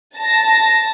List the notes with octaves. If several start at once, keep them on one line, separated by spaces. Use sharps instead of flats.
A5 A#6